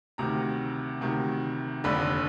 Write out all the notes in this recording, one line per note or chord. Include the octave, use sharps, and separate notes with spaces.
D2 C3 D#3 A#5
D2 C3 D#3
F1 D#2 D3 B5